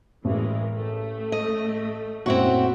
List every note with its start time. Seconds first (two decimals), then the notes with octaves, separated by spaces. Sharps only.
0.25 A1 E3 G#3 A#4
0.75 A3
1.32 D#5
2.26 F#2 A#2 C4 E4 F#4 C#6